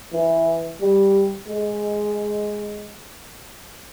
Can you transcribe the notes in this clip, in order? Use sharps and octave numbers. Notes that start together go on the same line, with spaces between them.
E3
G3
G#3